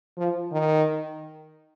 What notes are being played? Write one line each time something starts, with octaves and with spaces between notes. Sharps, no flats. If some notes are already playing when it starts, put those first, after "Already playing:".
F3
D#3